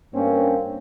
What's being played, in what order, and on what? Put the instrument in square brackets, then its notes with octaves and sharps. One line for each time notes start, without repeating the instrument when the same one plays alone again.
[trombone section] G2 A#3 C4 C#4